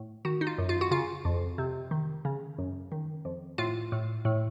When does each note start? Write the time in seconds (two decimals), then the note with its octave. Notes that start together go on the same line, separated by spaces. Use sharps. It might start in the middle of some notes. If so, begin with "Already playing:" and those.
Already playing: A2
0.25 D#3 F#4
0.41 D#4
0.47 F4
0.58 F#2
0.69 F4
0.81 F#4
0.91 C#3 F4
1.25 F2
1.58 C3
1.91 D#3
2.25 C#3
2.58 F#2
2.92 D#3
3.25 F2
3.58 A2 F4
3.92 A2
4.25 A2